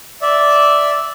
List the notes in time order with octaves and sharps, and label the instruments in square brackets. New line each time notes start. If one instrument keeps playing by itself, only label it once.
[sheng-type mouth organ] D5 E5